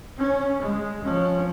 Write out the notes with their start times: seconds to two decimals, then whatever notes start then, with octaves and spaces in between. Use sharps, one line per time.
0.18 C#4
0.62 G#3
1.04 F3 C#4